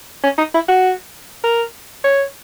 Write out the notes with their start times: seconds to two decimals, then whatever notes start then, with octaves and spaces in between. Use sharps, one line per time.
0.24 C#4
0.38 D#4
0.54 E4
0.68 F#4
1.44 A#4
2.04 C#5